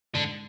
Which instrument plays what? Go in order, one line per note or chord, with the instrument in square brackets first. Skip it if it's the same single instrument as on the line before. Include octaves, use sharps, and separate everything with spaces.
[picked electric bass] G#2 [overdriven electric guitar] D3